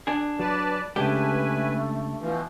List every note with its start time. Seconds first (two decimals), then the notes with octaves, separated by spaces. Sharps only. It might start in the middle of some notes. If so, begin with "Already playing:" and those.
0.07 D4 G#4
0.39 F#3 B4 D5 A5
0.96 C#3 G#3 A3 D4 G4 B4 G#5
2.20 B2 E3 F3